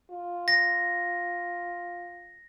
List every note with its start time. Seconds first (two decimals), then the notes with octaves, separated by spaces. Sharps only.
0.11 F4
0.48 A#6